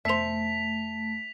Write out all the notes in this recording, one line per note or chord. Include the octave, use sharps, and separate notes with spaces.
F1 F2 A3 B3 C5 E5 B6 F7